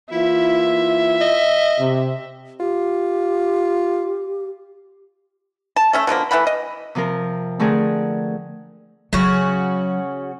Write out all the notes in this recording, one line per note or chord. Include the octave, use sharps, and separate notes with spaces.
E3 A#3 E4 F4 E5
D#5
C3
F4 G4
A5
A3 C#4 E5
B2 D3 F3 A#3
E3 A3 F#5 B5
D#5
C3 F3 C4 A#4
D3 A3 C4 G#4 A#4
C#3 F#3 C#4 F#4